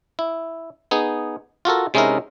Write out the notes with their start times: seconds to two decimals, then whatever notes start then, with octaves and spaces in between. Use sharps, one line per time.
0.19 E4
0.91 B3 D#4 G#4
1.65 F4 F#4 A4 A#4
1.94 C3 G#3 C#4 D#4 E4 A#4